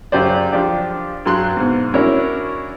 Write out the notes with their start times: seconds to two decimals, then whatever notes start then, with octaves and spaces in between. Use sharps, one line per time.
0.12 F#2 C#3 F#3 G4 C5 D5
0.52 F3 D4 G4
1.25 G2 F#3 C6 F#6
1.57 G#2 B2
1.94 C#4 D4 E4 F#4 A#4 C#5